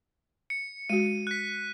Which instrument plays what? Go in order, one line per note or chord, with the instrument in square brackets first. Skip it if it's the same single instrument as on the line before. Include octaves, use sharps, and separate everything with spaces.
[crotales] C#7
[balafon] G#3 F#4 [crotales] D#7
[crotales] F#6 B6